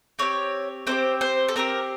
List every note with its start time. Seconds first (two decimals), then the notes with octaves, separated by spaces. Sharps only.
0.19 C4 D#4 G4 C#5
0.87 C4 D#4 G4 C5
1.21 C5
1.48 A4
1.56 C4 D#4 G4 A#4